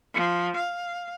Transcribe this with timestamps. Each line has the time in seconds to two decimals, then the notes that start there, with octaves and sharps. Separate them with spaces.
0.14 F3
0.56 F5